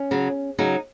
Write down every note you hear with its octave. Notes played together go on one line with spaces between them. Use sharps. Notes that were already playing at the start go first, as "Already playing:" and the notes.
Already playing: C#4
C#3 F#3
C#3 F#3 D#4